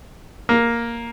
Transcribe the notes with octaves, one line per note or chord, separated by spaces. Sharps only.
A#3